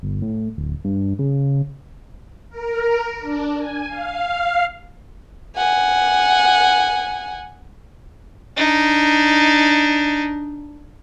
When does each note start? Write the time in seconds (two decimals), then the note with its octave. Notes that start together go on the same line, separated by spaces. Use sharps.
0.03 G1
0.22 A2
0.58 D1
0.85 G2
1.19 C#3
2.50 A#4
3.19 D4
3.58 G#5
3.88 F5
5.56 F#5 G#5
8.57 D4 D#4